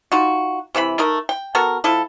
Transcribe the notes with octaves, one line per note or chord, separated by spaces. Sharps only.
D#4 F4 F#4
C3 E3 F4 B5
A3 D#4 A#4
G5
B3 F#4 A4 A#4
F3 E4 A4